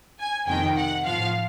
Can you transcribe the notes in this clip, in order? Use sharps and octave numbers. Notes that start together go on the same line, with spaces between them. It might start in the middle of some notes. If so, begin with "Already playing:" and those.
G#5
F2 C3 D#3 G5
F#5
A2 F3 F5